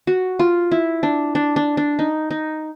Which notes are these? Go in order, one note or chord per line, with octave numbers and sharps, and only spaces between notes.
F#4
F4
E4
D4
D4
D4
D4
D#4
D#4